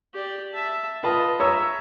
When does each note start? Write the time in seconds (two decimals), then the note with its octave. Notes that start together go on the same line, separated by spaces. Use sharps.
0.14 G4 D5
0.52 E5 A5
1.03 F4 B4 D#5 A5
1.40 C#5 E5 A#5 E6